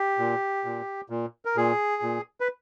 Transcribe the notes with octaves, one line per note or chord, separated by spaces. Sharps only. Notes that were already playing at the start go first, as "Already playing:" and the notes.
Already playing: G4
A#2
A#2
A#2
A#4
A#2 G#4
A#2
B4